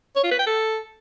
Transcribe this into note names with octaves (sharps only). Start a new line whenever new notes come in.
C#5
F4
B4
G5
A4